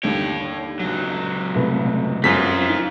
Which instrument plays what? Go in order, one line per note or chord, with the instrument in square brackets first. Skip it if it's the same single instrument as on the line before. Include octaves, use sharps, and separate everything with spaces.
[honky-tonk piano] D#2 D3 G3 [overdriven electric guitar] C#5 G5
[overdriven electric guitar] C#2 F#3
[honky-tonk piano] F1 C2 B4
[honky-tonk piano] G1 [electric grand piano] F#2 B6 [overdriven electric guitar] C4 F4
[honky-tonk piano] D#4